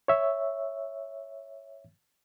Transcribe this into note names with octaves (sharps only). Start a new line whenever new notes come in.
C#5 E5